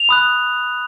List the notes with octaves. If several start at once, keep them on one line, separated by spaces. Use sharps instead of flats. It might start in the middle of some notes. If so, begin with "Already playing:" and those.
Already playing: F7
B5 D#6 F#6